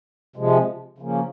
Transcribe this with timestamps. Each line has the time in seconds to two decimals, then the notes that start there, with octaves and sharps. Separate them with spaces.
0.36 C3 F3 G#3
0.98 C#3 F3 A#3 C#4